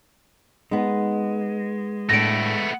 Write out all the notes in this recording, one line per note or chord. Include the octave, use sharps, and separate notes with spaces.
G#3 B3 D#4
A2 A3 B3 D4 A#6 D7